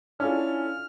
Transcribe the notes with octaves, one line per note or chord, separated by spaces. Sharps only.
C#4 D4 E4 F4 A4 G#5 F6